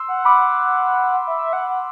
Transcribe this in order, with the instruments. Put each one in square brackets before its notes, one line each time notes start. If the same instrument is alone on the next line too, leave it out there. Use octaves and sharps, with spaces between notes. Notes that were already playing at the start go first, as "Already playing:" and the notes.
Already playing: [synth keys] C6 E6
[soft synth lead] F#5
[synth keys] B5 D6
[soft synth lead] E5
F#5
F#5